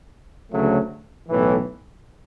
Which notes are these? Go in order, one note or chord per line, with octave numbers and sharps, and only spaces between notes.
D2 C#3 F#3 A3
B1 A2 E3